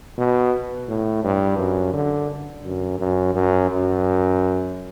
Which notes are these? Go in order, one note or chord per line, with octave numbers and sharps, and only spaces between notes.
B2
A2
G2
F#2
D3
F#2
F#2
F#2
F#2